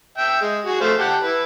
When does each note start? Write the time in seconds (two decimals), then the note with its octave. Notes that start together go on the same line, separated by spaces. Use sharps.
0.18 E5 G5
0.41 G#3
0.66 F#4 G#4
0.81 A3 C5 F5
0.99 G4 F#5 A5
1.23 E4 B4